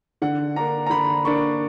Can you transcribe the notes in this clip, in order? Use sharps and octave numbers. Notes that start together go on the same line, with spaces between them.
D3 F#5
A#3 D4 A#5
A#5
D3 B5
A#3 D4 C#6